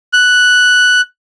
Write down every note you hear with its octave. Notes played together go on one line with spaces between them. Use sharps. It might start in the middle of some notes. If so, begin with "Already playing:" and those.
F#6